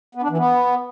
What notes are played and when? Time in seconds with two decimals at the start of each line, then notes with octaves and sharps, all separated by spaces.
0.15 B3
0.22 D4
0.30 E3
0.38 B3